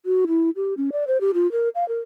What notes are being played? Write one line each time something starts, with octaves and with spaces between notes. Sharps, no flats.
F#4
E4
G4
C#4
D5
C5
G4
F4
A#4
F5
A#4